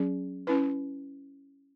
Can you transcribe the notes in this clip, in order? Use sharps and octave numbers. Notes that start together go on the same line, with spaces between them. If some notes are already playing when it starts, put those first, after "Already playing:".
Already playing: F#3 C#4 G#4
C#4 E4 B4